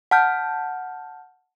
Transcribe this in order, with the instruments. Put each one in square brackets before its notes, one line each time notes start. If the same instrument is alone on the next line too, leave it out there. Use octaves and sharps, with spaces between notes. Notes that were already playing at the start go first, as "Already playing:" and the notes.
[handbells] F#5 A5 F6 G6